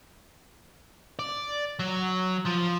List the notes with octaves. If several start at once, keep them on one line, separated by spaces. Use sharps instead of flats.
D5
F#3
F3